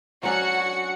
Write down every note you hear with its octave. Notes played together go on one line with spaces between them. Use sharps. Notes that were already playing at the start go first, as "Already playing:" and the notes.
F#3 C#4 D4 F#4 F#5 C#7